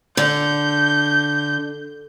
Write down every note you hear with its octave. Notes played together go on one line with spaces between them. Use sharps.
D3 G6